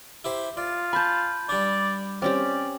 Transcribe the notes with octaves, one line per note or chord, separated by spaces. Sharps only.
E4 G4 C5
F4 D5
G#5 A5 B5 G6
G3 D4 D5
C4 C#4 G4 D5